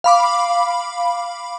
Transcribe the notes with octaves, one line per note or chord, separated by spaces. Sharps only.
F5 B5 D6